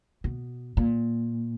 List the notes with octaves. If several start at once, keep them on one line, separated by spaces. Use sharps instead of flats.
B2
A#2